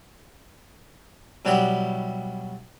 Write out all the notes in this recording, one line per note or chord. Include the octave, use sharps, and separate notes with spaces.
B2 F#3 G3 E4 F#4 G4